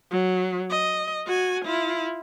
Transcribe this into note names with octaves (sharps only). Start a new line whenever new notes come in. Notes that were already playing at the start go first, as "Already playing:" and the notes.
F#3
D#5
F#4 G#5
E4 F4